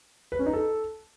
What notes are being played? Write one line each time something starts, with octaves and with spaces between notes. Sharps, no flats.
B4
C#4
D#4
A4